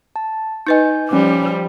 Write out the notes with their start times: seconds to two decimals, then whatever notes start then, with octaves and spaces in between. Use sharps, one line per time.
0.16 A5
0.67 D#4 B4 D#5 G#5 G6
1.09 F3 G3 C#4 D6